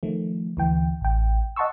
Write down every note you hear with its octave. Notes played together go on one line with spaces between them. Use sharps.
D#3 F3 A3
D2 E3 G5
A1 G5
D#5 F#5 A5 C6 C#6 E6